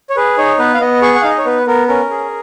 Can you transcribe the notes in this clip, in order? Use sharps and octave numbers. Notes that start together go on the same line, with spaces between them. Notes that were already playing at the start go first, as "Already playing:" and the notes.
C#5
G#4 B4
D#4 C#5
B3 B4
F5
B3 D#5
G#4 C#6
F#5
D#4 F5
D#5
C#5
B3 B4
B3 A#4
C#4 A#4
G#4